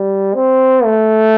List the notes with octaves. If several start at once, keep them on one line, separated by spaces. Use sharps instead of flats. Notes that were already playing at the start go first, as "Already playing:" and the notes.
Already playing: G3
C4
A3